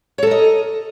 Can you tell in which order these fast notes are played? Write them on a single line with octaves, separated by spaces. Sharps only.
C#5 A4 A#4 D#5